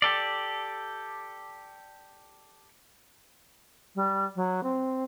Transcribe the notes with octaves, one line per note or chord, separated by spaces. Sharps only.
G4 A4 D5
G3
F#3
C4